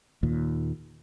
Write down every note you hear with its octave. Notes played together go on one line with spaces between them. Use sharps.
D#2 A#2